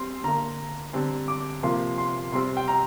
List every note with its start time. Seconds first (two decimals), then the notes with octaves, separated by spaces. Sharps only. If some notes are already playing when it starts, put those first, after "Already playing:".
Already playing: G3 C4 C6
0.24 D3 A#3 A#5
0.93 D3 G3 C4
1.28 D6
1.63 C3 F3 A#3 C6
1.98 C6
2.32 C3 G3 C4 C6
2.57 G5
2.68 A#5